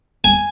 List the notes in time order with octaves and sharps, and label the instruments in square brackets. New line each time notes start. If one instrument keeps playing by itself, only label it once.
[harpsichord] G#5